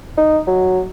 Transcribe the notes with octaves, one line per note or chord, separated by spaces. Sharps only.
D#4
F#3